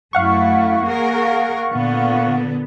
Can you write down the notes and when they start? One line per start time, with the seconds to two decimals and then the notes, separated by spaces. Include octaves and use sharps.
0.13 F#2 A3 E4 F5 F#5 C#6
0.86 A#3 G#4 A#4
1.72 A#2 D3 B3